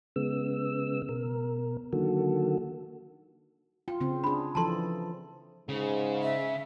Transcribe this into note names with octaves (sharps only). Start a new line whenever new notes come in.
C#3 G#3 B3 E6
B2 A#4
D3 D#3 F#3 A#3 F#4 A4
F4 G5
C#3 C4
D4 G#4 B5
E3 F3 A4 A5 A#5 C6
G#2 C#3 G#4
E5